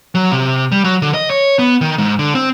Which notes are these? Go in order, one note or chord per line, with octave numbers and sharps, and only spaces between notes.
F#3
C3
G3
F#3
D3
D#5
C#5
B3
D#3
G#2
D3
C4